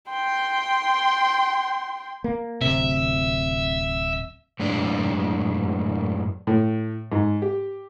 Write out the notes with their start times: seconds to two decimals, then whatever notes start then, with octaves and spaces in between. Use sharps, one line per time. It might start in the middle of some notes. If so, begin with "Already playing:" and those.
0.10 G5 C6
2.24 A#3
2.61 D1 C3 E5
4.60 F#2 A2 G#3 D4
6.47 A2
7.12 G#2
7.42 G4